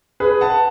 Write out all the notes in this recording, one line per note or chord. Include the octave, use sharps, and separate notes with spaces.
G#4 B4
F#5 A5